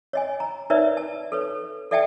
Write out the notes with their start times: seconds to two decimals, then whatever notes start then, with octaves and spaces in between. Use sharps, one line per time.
0.13 C#5 D#5 G#5
0.40 A#5
0.70 D#4 A#4 B4 C#5 D5 E5
0.97 A5
1.32 A4 B4 C#5
1.91 A4 D5 E5 F#5 G5 A5